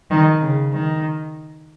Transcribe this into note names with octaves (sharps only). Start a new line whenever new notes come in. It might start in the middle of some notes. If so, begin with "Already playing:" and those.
D#3
C#3
D#3